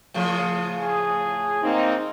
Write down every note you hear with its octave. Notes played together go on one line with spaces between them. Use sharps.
A2 C#3 F3
G#4
A#3 C4 D#4